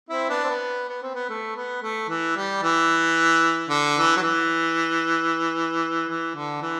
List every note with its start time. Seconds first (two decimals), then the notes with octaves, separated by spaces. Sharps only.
0.09 C4 E4
0.29 B3 D4
0.44 C4
0.49 B3
0.89 B3
1.02 C4
1.14 B3
1.29 A3
1.56 B3
1.82 A3
2.09 E3
2.36 G3
2.63 E3
3.69 D3
3.96 E3
4.16 F#3
4.22 E3
6.09 E3
6.35 D3
6.62 E3